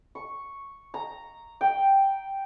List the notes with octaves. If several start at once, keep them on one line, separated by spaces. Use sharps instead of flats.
C#6
A#5
G5